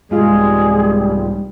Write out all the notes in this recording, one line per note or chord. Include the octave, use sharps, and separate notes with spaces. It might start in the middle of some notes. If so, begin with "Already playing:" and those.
C2 G#2 G3 G#3 F4 G#4